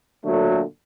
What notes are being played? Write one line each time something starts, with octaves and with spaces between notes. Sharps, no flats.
A#2 D3 F#3 A3